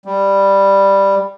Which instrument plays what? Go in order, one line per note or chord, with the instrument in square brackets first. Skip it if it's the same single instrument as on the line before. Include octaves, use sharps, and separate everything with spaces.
[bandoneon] G3